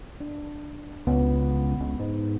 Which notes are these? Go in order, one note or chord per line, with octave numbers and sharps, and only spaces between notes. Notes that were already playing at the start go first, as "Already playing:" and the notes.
D4
C#2 B3
C#2
G#2